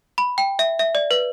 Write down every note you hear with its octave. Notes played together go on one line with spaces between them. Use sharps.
B5
G5
E5
E5
D5
B4